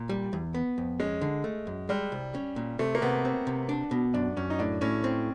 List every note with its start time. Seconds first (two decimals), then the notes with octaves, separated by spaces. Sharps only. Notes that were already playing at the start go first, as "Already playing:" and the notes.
Already playing: A#2
0.09 G3
0.33 E2
0.54 B3
0.78 F2
1.00 G#3 C#4
1.21 D3
1.44 A3
1.67 F#2
1.89 G3 G#3
2.12 C2
2.35 C#4
2.56 A#2
2.79 C3 A3
2.95 A#3
3.02 C3 B3
3.25 C4
3.47 C3
3.69 D4
3.91 B2
4.14 F#2 D4
4.37 F#2 C#4
4.50 D#4
4.59 A2 D4
4.81 A2 C#4
5.04 C4